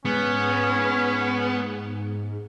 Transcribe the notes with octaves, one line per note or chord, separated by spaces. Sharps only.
G#2 B3 C#4